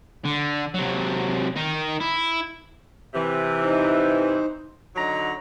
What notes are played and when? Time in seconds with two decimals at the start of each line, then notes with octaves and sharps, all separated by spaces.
0.25 D3
0.74 C3 F#3
1.56 D#3 D#4
2.00 E4
3.15 C3 E3
3.63 D#4 C5
4.96 D3 F#3 D#4 A#5